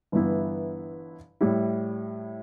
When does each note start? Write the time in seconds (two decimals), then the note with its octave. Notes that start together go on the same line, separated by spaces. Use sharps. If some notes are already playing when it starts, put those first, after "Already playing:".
0.12 G1 G2 E3 B3 E4
1.41 A2 G3 E4